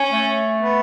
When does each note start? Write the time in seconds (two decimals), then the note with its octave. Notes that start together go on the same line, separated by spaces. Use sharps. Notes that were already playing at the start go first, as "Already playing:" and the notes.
Already playing: C#4
0.12 A3
0.61 B3